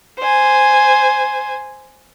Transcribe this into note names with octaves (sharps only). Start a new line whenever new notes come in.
C5 G#5